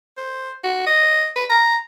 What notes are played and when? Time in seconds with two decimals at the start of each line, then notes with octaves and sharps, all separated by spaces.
0.17 C5
0.63 F#4
0.86 D#5
1.36 B4
1.50 A#5